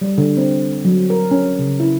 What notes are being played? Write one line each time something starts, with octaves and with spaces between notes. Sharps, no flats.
G3
D3
C4
F#3
A#4
C#4
C#3
E4